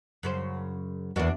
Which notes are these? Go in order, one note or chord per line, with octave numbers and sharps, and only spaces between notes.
F#2 C#3 C5
E2 G#2 D4 F#4 D5